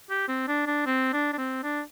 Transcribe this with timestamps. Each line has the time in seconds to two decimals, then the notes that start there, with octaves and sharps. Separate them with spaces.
0.10 G4
0.28 C4
0.48 D4
0.67 D4
0.86 C4
1.13 D4
1.33 D4
1.38 C4
1.63 D4